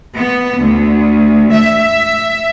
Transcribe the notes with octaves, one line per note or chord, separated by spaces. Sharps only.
B3
D2
E5